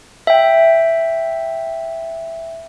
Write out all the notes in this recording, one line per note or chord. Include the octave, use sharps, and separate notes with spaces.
E5 G5